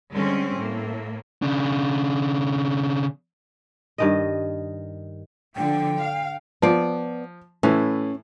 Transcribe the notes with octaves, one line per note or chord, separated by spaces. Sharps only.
D3 G3 G#3 C4 C#4
A2 A#3
C#3 D4
G2 D#3 D#5
D3 F3 G5
F5
F3 B3 D5
A2 E3 C#4